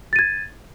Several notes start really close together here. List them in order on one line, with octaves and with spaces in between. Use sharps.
A6 D#7 G#6